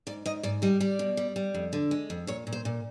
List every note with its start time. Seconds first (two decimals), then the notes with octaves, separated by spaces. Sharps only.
0.07 G#2 D5
0.26 G#2 D#5
0.43 G#2 D5
0.62 G3 D#5
0.80 G3 D5
0.99 B2
1.17 G3
1.36 G3
1.54 F2
1.73 D3
1.91 G#3
2.10 F2
2.27 A#2 C#5
2.47 A#2
2.52 C5
2.65 A#2